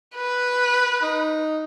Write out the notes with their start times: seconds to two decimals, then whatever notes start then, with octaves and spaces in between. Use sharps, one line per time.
0.17 B4
1.02 D#4